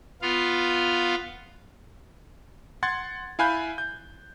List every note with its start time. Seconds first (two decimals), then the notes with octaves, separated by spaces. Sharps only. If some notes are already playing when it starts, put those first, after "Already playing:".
0.22 B3 F4 F5
2.83 F#5 C6 G#6 A6
3.39 E4 F5 G#5 B5 F#6 G6
3.78 G6